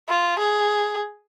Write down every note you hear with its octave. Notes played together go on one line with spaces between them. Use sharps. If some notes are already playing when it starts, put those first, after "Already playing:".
F4
G#4